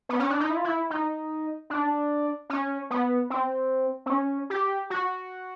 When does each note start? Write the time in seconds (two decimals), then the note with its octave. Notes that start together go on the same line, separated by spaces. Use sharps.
0.09 B3
0.19 C#4
0.30 D4
0.40 D#4
0.50 E4
0.57 F4
0.64 E4
0.90 D#4
1.70 D4
2.50 C#4
2.90 B3
3.30 C4
4.06 C4
4.10 C#4
4.50 G4
4.90 F#4